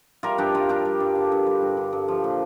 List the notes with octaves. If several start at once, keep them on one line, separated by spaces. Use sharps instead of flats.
G3 F4 A#4
G2 D4 G4
G2 F4 A#4
G3 D4 G4
G3
G2
D3
G2
G3
G2
D3
G2
F3
A#2